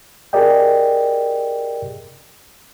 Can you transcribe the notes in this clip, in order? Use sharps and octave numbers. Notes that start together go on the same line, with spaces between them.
G4 G#4 A#4 D5 D#5 G5